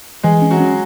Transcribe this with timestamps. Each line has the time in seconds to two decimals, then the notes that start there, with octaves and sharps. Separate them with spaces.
0.23 E3 G#3 G#4
0.42 C#4
0.51 F#3 F#4
0.60 C#4